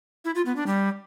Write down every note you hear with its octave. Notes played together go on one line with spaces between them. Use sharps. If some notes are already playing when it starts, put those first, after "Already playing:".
E4
F4
B3
D4
G3